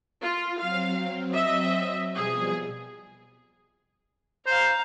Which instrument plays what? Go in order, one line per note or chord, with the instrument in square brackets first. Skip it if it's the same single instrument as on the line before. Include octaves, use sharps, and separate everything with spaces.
[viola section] F4
[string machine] F#3 C4 [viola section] F5
[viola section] D#5 E5
[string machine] B2 F3 G3 [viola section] G#4
[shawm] C5 [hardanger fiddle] F5 A#5